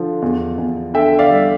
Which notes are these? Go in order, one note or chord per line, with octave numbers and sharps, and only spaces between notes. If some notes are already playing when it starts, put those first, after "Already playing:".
Already playing: D3 F3
E2
E2
D3 E5 G5
D5 F5
G3